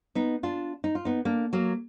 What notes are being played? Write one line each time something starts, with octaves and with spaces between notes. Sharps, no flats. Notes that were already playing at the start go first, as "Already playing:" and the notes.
B3 D#4
D4 F4
D#4
F4
B3 D#4
A#3 D4
F#3 A#3